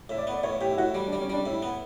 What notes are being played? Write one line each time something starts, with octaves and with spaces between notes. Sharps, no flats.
A2 E5
D5
B3
D5
A2 C#5
A2 G4
E4
A2 F#4
G3
D4
G3
C#4
G3 D4
A2 E4
B3